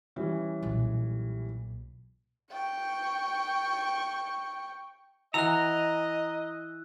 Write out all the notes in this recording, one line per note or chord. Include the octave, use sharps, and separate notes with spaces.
E3 G3 C#4
B1 A#2
G5 C#6
E3 D#5 F#5 G#5 A#5 E6 F#6